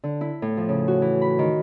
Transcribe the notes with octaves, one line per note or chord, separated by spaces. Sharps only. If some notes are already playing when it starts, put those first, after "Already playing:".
D3
E4
A2
F3
C#3
F#4
E3
B5
D#3